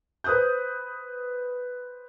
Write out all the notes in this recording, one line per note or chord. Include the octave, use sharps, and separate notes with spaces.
B4 C5 D#6 F#6 G6